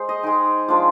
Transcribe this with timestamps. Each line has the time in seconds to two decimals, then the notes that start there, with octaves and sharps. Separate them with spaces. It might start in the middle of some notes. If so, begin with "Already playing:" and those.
Already playing: G#3 C5
0.09 D#5
0.23 G#3 D#4 G5
0.68 F3 G#3 D4 F4 D6